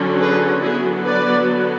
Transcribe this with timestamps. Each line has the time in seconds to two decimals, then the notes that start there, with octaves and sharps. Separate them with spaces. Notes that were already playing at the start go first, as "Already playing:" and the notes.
Already playing: D3 F#3 C#4
0.20 G#4 B4
0.62 D3 F#3 B3 E4 G#4
1.06 B4 D5